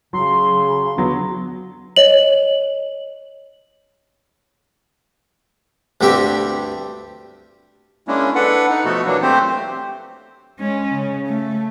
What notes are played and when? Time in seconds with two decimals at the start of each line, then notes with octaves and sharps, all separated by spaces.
0.13 C#3 F#3 C6
0.97 D3 F#3 B3
1.96 C#5 D#5 F#7
6.01 D2 G2 C4 G4 E5
8.08 G#3 A#3 C#4 D4 E4
8.35 D4 A4 B4 F#5
8.70 D#4
8.85 B2 F3 A3 B3 F#4 A4
9.05 E3 F#3 A#3 D4
9.22 A3 C4 G4 C5
10.59 G#3 C#4
10.94 C#3
11.28 A3